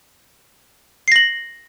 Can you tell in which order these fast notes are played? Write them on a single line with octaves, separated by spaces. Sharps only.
C7 A#6 F#7